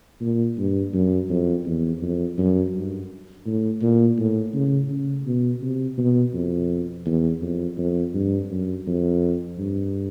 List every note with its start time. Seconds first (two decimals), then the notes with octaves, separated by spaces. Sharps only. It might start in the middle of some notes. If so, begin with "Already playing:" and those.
0.21 A#2
0.58 G2
0.94 F#2
1.29 F2
1.66 E2
2.02 F2
2.38 F#2
2.74 G2
3.46 A2
3.82 A#2
4.18 A2
4.54 C#3
4.90 C#3
5.26 B2
5.62 C3
5.98 B2
6.34 F2
7.06 E2
7.42 F2
7.78 F2
8.14 G2
8.50 F#2
8.87 F2
9.58 G2